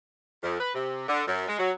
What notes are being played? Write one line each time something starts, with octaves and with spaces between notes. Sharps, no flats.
F2
B4
C3
D3
F#2
G#3
F#3